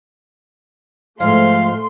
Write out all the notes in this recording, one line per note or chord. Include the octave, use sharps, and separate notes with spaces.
G#2 F3 A3 F5 C6